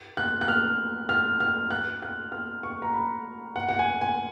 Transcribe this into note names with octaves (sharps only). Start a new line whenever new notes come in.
F#6
F#6
F6
F6
F6
F#6
F#6
F6
C#6
A#5
B5
F#5
F#5
G#5
G#5